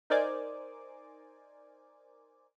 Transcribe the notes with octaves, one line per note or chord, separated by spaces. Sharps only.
D#4 A#4 C5 D5 G#5 D6